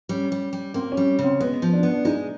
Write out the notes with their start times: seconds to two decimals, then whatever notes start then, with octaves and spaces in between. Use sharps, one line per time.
0.09 G3 C#4
0.32 G3
0.53 G3
0.74 A#3 C4
0.92 C#4
0.97 G3
1.19 C#3
1.24 C4
1.40 G#3 B3
1.62 F3
1.73 D4
1.83 B3
1.89 D4
2.05 G#3 D#4